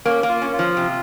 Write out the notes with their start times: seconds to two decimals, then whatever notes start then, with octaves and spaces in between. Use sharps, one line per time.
0.05 A#3 C#4
0.23 A#3
0.29 F4
0.42 C#4
0.53 F4
0.59 F3
0.77 C3